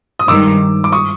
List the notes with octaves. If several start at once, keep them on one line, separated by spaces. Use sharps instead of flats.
D#6
G2 D#3 G#3 D6 E6
D6
C#6 D#6